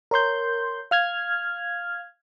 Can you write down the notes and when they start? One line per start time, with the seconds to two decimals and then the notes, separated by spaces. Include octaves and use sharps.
0.11 A#4 C#5 C6 G6
0.91 F5 F6 G#6